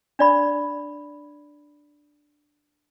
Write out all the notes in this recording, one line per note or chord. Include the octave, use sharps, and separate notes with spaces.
D4 D5 B5